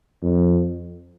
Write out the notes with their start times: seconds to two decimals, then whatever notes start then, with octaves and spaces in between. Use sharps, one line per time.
0.22 F2